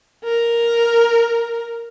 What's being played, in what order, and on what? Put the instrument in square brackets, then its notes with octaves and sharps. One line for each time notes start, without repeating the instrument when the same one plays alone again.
[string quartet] A#4